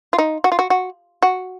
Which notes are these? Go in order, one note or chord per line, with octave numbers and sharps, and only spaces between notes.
F4
D#4
F#4
F4
F#4
F#4
F#4